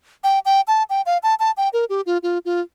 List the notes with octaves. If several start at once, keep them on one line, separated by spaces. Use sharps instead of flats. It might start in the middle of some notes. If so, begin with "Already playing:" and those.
G5
G5
A5
G5
F5
A5
A5
G5
A#4
G4
F4
F4
F4